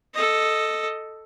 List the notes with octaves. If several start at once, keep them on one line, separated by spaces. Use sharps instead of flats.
A4 D#5